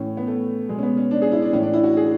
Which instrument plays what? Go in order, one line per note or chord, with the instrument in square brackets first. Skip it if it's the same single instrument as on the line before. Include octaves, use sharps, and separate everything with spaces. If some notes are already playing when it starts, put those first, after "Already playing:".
Already playing: [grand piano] A2 E3 C#4
B3
A3
B2 G#3
C#4
B3
C#4
D4
G#4
E4
D4
A2 E3 C#4
D4
E4
F#4
G#4